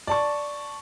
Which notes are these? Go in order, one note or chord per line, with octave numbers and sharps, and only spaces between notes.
D5 A5 C#6